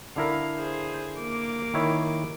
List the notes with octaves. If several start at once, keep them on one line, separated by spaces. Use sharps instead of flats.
D3 E4 A#4 F5
G#4 C5
A#3 D6
D#3 E4 C#5